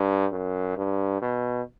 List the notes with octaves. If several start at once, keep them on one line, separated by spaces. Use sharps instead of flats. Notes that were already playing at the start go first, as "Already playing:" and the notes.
Already playing: G2
F#2
G2
B2